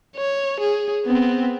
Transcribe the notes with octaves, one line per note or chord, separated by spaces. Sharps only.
C#5
G#4
B3 C4